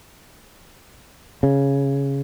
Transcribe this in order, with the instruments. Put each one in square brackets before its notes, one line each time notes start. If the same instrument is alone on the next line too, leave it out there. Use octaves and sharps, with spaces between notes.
[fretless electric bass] C#3